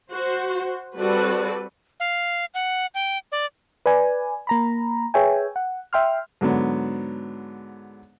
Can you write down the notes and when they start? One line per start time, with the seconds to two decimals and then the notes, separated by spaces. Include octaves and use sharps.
0.11 F#4 C5
0.96 G3 C4 F#4 A4 B4 D5
2.00 F5
2.54 F#5
2.95 G5
3.32 D5
3.86 B4 D5 G#5
4.47 A#3 A#5 B5
5.14 G#4 B4 C#5 E5 G5 G#5
5.56 F#5
5.93 E5 G5 C6 F6
6.41 G#2 D3 F#3 B3